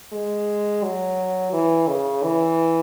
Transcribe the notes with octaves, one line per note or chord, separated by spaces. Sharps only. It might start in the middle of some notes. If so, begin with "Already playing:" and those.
G#3
F#3
E3
C#3
E3